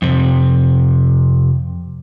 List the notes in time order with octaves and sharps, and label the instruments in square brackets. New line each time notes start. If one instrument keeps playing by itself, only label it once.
[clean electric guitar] F2 C3